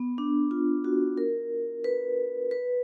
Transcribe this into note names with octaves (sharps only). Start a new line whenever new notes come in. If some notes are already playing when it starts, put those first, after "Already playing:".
Already playing: B3
D4
F4
F#4
A#4
B4
B4